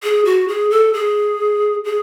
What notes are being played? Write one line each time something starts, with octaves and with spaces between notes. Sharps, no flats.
G#4
F#4
G#4
A4
G#4
G#4